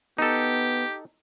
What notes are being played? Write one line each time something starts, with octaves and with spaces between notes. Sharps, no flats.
B3 D#4 G4 A4